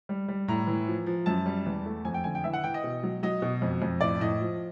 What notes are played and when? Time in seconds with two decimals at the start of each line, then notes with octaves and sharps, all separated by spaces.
0.09 G3
0.28 G3
0.48 A2 A#5
0.67 E3
0.88 F3
1.07 F3
1.26 F#2 A5
1.46 G3
1.66 E2
1.86 A3
2.05 F2 G#5
2.14 G5
2.24 D3 G#5
2.35 G5
2.44 E3 E5
2.53 F#5
2.64 E3 G5
2.74 D#5
2.84 B2
3.03 F#3
3.23 F#3 D#5
3.42 B2
3.62 F2
3.82 F2
4.01 A2 D5
4.20 A2 D#5
4.41 F3